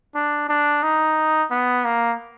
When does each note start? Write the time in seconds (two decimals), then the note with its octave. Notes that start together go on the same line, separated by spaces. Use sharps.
0.15 D4
0.49 D4
0.83 D#4
1.51 B3
1.85 A#3